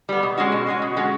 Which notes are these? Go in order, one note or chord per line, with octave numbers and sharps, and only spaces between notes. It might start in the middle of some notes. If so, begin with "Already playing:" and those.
G3 B3
B2
G#3 C#4 F#4
B2
G#3 C#4 F#4
B2
G#3 C#4 F#4